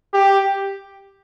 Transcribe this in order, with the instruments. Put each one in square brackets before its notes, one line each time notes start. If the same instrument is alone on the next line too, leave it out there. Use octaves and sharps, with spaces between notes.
[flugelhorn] G4